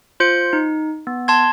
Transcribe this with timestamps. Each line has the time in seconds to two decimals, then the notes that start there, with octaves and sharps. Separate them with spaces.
0.20 F4 C5 G6 C#7
0.53 D#4
1.07 B3
1.28 A5 C6 G#6